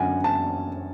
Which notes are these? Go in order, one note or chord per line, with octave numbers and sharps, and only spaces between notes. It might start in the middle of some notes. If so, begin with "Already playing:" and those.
Already playing: F#2 D3 F#3 F#5 G#5
A5